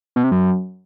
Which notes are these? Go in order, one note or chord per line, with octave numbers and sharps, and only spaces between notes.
B2
C3
F#2